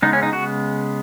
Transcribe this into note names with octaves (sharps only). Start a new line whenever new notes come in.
C#3 G#3 B3 D#4
C#4
D#4
F#4